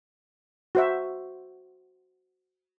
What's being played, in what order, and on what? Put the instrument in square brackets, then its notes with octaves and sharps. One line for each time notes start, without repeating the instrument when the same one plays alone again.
[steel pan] F#4 C5 E5